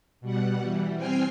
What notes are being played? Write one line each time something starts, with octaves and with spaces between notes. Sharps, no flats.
B2 G3 F#5
E3 G3
C4 G5 G#5 F6 C7